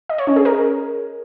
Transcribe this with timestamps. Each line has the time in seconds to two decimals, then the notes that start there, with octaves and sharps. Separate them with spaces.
0.09 D#5
0.18 C#5
0.27 C#4
0.36 G#4
0.45 A#4